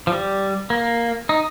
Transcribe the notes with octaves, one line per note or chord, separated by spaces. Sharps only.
F3
G3
A#3
D#4